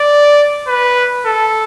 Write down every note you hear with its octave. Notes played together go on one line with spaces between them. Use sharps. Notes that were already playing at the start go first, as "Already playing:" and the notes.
Already playing: D5
B4
A4